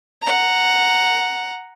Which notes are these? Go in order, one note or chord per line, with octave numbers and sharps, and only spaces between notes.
F#5 A#5